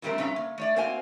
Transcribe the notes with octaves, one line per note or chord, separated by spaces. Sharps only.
F2 E3 G3 A3 C4 A#4
G2 C3 C#4 D#4 E5 A#5
A#3
A3 C#5 D5
A#3 C4 F#4 C5 F5 G#5